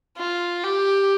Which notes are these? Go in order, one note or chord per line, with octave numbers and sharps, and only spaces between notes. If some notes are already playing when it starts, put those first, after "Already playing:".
F4
G4